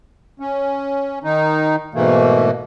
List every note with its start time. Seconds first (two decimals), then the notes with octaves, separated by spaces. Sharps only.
0.40 C#4
1.24 D#3 D#4
1.94 G#2 B2 E3 A3 A#3